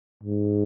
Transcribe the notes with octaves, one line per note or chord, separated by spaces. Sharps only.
G#2